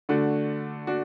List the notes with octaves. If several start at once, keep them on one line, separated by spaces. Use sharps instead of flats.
D3 A3 D4 F#4
D4 F#4